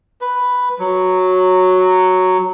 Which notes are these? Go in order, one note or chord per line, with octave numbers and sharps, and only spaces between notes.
B4
F#3